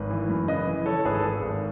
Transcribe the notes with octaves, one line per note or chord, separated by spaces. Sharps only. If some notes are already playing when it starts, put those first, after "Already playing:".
Already playing: G#1 B4
E3
F#2
C#3 B4 D#5
E3
E3 A4 C#5
G#1 G#4 B4
A4
G#1 G#4
G#1